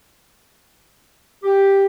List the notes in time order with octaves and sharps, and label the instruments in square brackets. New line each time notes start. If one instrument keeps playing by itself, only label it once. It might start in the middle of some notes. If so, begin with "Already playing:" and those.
[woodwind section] G4